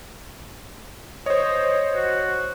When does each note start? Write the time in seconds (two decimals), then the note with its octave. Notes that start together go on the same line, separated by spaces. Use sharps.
1.26 C5 C#5 D#5
1.95 F#4